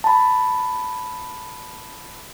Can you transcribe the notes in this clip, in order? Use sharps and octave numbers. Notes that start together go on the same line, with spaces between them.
A5 B5